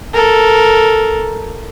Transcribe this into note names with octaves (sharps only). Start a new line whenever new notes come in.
A4 A#4